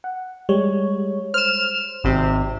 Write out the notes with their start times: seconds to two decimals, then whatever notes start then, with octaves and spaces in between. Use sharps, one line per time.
0.04 F#5
0.49 G3 G#3 C#5
1.34 C5 F6 E7
2.04 G#1 C3